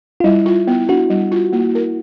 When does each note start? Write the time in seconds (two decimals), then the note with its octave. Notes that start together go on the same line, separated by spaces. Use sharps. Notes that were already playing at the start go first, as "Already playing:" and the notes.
0.20 F4
0.24 G3 E4
0.46 F4
0.67 B3
0.88 D4 F#4
1.10 G3
1.32 F4
1.53 A#3
1.75 A#4